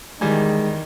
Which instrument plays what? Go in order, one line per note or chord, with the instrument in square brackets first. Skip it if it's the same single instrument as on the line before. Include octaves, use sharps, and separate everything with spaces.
[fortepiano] E2 G3 G#5 [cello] D#3 [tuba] G#3